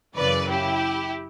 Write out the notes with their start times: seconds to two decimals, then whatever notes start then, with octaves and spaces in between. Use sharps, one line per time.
0.16 F#2 C#3 E3 B4 D5
0.50 E4 G4